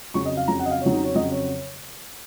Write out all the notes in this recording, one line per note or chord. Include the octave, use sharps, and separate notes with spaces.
F2 C#3 F#3 C#6
D#5
F5
F2 C#3 F#3 A#5
F#5
D#5
F5
F2 C#3 F#3 C#5
D#4
C#5
F2 C#3 F#3 D#5
C#5